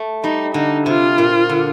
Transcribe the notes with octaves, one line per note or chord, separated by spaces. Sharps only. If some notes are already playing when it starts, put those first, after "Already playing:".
Already playing: A3
G3 D#4
D3 D#4
C3 F4
A#2
D3